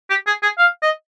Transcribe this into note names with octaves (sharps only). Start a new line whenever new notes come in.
G4
G#4
G#4
F5
D#5